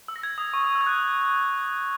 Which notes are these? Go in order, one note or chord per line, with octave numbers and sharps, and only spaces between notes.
E6
A#6
G#6
D#6
C#6
D#6
E6
G#6
F#6